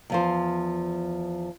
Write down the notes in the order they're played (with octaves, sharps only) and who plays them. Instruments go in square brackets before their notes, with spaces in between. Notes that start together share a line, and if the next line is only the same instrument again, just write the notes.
[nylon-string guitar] E2 F3 C5